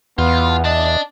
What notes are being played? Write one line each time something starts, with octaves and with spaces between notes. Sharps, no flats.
E2 B3 F4
D5 D#5 A5